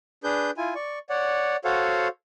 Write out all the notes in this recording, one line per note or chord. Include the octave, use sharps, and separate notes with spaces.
D4 G#4 B4 G6
E4 F4 G#5
D5 C#6
C#5 D5 F#5
F#4 A4 C5 C#5 F5 F#5